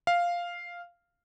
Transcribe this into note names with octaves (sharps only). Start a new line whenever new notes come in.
F5